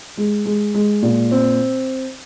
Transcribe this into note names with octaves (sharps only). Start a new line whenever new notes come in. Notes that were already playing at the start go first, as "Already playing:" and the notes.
G#3
G#3
G#3
A#2
C4